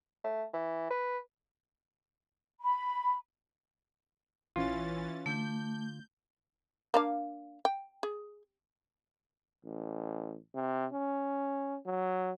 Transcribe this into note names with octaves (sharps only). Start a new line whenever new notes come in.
A3
E3
B4
B5
A#1 E3 C#4 F4 A6
D3 A3 G6
A#3 D4 F5
G5
G#4
A1
C3
C#4
F#3